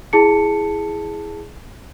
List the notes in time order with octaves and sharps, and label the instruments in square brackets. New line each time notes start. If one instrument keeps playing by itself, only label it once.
[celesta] E4 G#4 A5 C#7